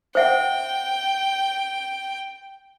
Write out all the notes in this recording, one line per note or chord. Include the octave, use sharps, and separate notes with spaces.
C5 E5 F#5 G5